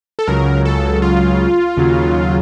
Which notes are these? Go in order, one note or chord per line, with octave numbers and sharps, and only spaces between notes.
A4
C#2 C#3 F#3 A#4
A4
F4
D#2 C#3 F#3